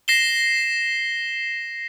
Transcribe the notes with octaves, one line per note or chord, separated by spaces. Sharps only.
A#6 C7 E7 G7